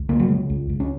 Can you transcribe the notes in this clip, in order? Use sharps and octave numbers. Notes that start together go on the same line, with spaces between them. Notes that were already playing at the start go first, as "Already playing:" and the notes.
Already playing: C#2
C#3 A#3
F#3
C#3 G#3
C#2
C#2
C#4